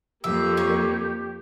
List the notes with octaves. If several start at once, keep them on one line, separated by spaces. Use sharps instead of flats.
F2 A#3 G4 E5
C#5